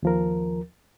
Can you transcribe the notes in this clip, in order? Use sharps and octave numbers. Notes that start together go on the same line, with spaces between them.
D#2 F3 A#4